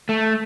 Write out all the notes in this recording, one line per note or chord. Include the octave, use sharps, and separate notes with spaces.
A3